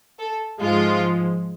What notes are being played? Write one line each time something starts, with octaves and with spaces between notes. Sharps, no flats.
A4
G#2 F3 G#3 F4